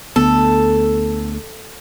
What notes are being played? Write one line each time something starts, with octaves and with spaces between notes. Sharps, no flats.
D2 B3 A4